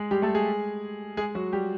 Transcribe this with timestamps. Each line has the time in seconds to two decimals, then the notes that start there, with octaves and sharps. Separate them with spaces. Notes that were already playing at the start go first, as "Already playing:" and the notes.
Already playing: G#3 G#4
0.11 G3 G4
0.22 A3 A4
0.34 G#3 G#4
1.17 G#3 G#4
1.35 F#3 F#4
1.53 G3 G4